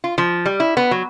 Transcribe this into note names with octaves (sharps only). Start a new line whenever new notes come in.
F4
F3
G3
E4
B3
F#3